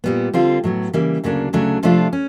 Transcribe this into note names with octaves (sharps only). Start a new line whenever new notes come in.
A#2 G3 B3
D3 G3 C4 F4
A2 F#3 B3
C#3 E3 G3 A#3
D2 C#3 F#3 A#3 D4
D2 C#3 F#3 A3 D4
C3 F3 A3 D4 F4
C#4